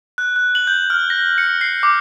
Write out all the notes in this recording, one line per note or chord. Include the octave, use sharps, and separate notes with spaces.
F#6
F#6
F#7
G6
F6
A#6
C#7
C7
D6